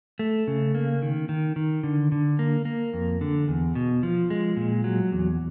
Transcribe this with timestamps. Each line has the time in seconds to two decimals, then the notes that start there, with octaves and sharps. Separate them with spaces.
0.19 A3
0.47 C#3
0.75 A#3
1.02 D#3
1.29 D#3
1.56 D#3
1.83 D3
2.12 D3
2.39 A#3
2.65 A#3
2.94 F2
3.21 D3
3.48 E2
3.75 B2
4.03 F3
4.30 G#3
4.57 A#2
4.84 F#3
5.12 E2